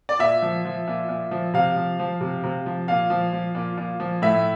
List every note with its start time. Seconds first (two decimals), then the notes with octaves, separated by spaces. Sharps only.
0.09 D5
0.19 A#2 E5
0.42 F3
0.65 F3
0.87 A#2
1.09 A#2
1.31 F3
1.54 C3 F5
1.76 F3
1.99 F3
2.21 C3
2.44 C3
2.66 F3
2.88 A#2 F5
3.10 F3
3.33 F3
3.55 A#2
3.77 A#2
4.00 F3
4.22 A2 E5